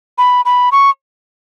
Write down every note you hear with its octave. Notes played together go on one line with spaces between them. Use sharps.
B5
B5
C#6